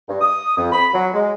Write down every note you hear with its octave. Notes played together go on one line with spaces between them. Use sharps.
G2
D#6
F2
B5
F#3
G#3